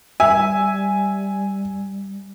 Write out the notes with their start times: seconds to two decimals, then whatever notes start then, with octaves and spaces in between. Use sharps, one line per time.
0.20 G3 E5 G#5